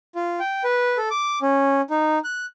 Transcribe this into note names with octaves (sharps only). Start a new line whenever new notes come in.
F4
G5
B4
A4
D6
C#4
D#4
F#6